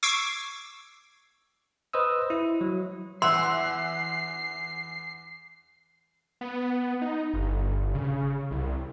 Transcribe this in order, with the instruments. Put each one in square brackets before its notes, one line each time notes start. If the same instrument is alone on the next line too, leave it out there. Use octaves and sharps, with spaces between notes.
[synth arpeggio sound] C#6 D6 E6 G#6 C7 D7
[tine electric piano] B4 C5 D#5 D#6 E6
E4
F#3
[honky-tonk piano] E2 F#5 [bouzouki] E5 [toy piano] C6 [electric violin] C7
[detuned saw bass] B3
D#4
G1
C#3
C2